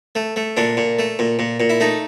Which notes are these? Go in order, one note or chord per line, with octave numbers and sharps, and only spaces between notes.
A3
A3
A#2 D4
A#2
A3
A#2
A#2
A#2
E4
A3 D#4